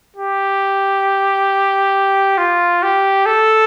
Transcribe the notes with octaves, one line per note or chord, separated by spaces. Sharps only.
G4
F4
G4
A4